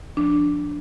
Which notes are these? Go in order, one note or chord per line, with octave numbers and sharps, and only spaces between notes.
F3 D4